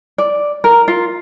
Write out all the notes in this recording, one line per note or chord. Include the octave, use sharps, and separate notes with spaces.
D5
A#4
F4